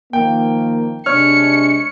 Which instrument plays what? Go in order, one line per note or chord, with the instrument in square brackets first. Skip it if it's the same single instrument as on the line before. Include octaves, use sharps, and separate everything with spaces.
[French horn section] D#3 F3 A#3 [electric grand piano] G5
[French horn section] C3 G#3 D4 [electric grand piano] C#5 F6 [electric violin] C#7